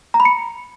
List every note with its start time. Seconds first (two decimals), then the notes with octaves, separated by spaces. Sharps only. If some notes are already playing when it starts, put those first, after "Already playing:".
0.14 A#5
0.20 B5
0.25 C#7